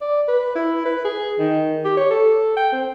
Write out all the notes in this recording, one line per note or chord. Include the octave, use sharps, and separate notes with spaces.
D5
B4
E4
B4
G#4
D#3
G4
C#5
A4
G5
C4